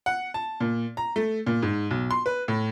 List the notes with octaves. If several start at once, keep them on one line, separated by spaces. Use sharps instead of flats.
F#5
A5
A#2
A#5
A3
A#2
G#2
B1
C6
B4
A2